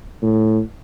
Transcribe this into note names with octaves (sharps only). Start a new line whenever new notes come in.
A2